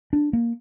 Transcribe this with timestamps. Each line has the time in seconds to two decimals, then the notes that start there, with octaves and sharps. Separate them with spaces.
0.13 D4
0.33 A#3